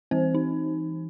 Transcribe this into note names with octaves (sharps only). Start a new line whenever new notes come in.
E3 C4 C5
D#4